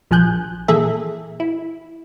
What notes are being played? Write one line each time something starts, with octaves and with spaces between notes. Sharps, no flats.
A#1 F3 G#5 F#6 G6
A#2 E3 A#3 G#4 A4 E5
E4